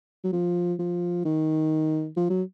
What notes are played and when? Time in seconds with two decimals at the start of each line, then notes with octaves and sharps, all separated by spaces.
0.24 F#3
0.33 F3
0.79 F3
1.25 D#3
2.17 F3
2.30 F#3